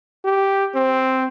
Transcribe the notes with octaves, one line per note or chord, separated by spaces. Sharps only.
G4
C4